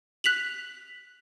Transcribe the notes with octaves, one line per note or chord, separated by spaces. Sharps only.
F#6 B6 F7 F#7